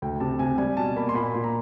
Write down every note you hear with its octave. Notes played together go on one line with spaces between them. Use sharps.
D2 G5
C3 A5
C3 G#5
G3 G#5
B2 A5
A#3 B5
C6
A#2 B5
A#2
A#5